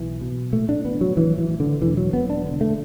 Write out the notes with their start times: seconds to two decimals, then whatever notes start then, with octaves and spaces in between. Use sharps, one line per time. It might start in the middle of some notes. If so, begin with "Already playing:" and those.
Already playing: B1 E3
0.21 B2
0.52 A2 A3
0.69 D4
0.85 A1 B3
1.01 F#3
1.16 A1 E3
1.38 E3
1.49 A2
1.60 D3
1.81 E1 E3
1.97 F#3
2.13 E1 B3
2.30 D4
2.45 D3
2.61 A3